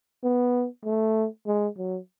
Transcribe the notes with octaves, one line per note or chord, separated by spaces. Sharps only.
B3
A3
G#3
F#3